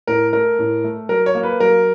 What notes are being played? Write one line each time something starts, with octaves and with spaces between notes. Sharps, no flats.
A2 A#4
A3 A#4
A2
A3
F#3 A#4
C#5
A#3
B4
F#3 A#4